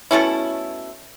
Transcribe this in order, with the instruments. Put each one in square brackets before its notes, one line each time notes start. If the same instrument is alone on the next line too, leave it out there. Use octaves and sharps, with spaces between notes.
[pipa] B2 A3 C#4 E4